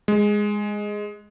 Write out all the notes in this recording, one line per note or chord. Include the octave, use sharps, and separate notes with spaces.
G#3